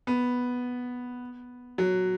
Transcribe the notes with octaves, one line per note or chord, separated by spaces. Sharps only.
B3
F#3